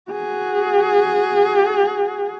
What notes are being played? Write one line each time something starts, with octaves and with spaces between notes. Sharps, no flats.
F#4 G#4